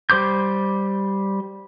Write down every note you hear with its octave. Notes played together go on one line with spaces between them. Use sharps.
G3 C5 D6 G6